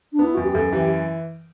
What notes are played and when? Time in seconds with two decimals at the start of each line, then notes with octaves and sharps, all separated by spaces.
0.12 D4
0.19 B3 E4
0.34 F#2 F#4
0.44 G4
0.54 F#2 A4
0.72 E3 G4